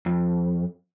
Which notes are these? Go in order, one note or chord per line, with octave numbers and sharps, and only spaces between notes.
F2